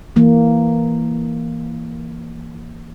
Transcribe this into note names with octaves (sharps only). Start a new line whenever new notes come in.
E3 A#3